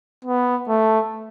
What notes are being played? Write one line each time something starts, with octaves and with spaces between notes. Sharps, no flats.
B3
A3